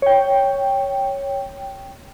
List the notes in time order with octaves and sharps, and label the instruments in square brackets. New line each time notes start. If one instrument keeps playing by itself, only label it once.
[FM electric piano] C#5 G5